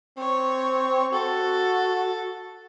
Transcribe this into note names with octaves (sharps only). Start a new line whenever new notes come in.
C4 C#5
F#4 A4